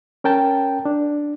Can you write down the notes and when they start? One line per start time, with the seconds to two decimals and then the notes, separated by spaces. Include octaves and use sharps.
0.24 C#4 A#4 G5 A5
0.85 D4